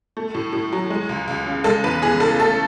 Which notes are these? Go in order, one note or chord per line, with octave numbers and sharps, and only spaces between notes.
A3
A2
A2
F#3
G#3
C#2
C#2
C#3
G#3 A4
E2 B4
E2 G#4
C#3 A4
A3 A4